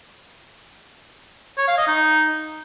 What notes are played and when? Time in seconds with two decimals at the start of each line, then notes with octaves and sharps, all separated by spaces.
1.58 C#5
1.68 F5
1.78 D#5
1.88 D#4